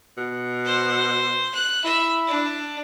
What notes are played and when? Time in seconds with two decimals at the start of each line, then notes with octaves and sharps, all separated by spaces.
0.17 B2
0.65 C5
1.54 F#6
1.84 E4 E5
2.28 D4